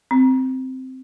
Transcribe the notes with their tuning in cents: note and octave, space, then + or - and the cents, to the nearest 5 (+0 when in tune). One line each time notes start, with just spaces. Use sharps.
C4 -10